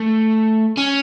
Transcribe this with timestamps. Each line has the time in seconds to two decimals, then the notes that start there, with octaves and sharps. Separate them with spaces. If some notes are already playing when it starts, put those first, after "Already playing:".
Already playing: A3
0.77 C#4